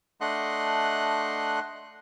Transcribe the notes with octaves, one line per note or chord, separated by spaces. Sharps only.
A3 D4 D#5 F#5 C6 F#6